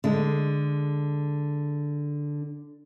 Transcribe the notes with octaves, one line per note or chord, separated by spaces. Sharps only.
D3 G#3